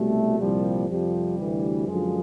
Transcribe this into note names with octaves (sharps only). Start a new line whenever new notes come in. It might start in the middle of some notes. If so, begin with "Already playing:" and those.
Already playing: C2 B2 F#3 G3 A3
C2 A#2 F3 G3
F2 C3 F3 G3
D2 C3 E3
F#2 D3 F3 G#3